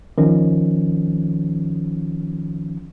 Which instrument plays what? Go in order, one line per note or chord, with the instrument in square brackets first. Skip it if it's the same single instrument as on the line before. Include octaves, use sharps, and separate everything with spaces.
[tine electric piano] D#3 F3 C#4